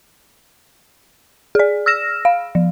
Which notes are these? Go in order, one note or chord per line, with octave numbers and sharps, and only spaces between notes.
G#4 D5
E6 F6 A#6 E7
F5
F3